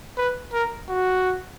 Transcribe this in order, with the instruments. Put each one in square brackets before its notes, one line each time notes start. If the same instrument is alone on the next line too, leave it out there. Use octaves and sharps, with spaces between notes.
[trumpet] B4
A#4
F#4